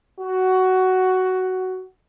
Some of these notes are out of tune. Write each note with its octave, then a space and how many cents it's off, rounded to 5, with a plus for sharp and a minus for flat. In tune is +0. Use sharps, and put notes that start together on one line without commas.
F#4 +10